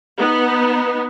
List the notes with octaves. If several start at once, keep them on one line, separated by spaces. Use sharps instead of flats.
B3 D#4